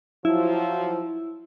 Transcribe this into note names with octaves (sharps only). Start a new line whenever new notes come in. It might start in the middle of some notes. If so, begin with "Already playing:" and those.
F3 F#3 E4